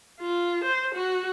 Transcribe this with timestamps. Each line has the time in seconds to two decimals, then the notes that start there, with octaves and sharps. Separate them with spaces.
0.21 F4
0.64 C5
0.95 F#4